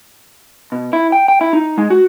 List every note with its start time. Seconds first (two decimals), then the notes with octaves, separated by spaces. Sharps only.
0.72 B2
0.93 E4
1.12 G5
1.28 G5
1.41 E4
1.53 D#4
1.78 G#3
1.90 F#4